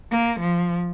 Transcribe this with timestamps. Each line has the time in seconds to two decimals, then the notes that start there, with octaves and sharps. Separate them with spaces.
0.11 A#3
0.40 F3